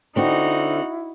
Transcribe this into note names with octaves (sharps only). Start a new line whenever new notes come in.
D3 C4 D#4 E4 F#4